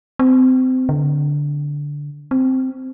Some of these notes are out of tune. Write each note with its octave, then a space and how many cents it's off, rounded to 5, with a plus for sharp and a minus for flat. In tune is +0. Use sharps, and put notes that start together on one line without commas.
C4 -25
D3 -10
C4 -5